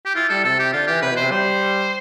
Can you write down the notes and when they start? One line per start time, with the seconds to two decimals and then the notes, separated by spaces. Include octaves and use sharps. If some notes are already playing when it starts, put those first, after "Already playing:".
0.06 G4
0.16 E4 F4
0.30 G3 A4
0.44 C3 A4
0.59 G4
0.73 D3 F4
0.87 E3 G4
1.02 C3 B4
1.11 B2
1.17 C3 C5
1.31 G3 C5